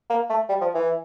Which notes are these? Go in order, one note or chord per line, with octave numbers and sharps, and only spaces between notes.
A#3
A3
G3
F3
E3